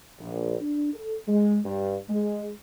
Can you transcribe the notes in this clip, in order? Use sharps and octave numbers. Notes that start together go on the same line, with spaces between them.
A#1
D4
A4
G#3
G2
G#3